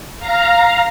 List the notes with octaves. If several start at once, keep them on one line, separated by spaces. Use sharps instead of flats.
F5 A#5